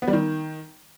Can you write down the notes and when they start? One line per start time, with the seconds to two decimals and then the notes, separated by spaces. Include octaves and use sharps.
0.02 B3
0.08 G3
0.13 D#3